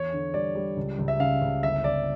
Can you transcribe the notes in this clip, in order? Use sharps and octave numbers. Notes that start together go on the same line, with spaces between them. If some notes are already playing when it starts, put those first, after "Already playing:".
Already playing: E2 C#5
D3
G3 D5
G3
C#2
C#2
E5
C#3 F5
C#2
G1 E5
G1 D5